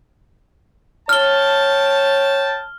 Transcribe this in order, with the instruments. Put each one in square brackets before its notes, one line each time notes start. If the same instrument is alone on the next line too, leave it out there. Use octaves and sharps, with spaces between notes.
[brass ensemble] C#5 G5 A5 [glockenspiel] F6 G7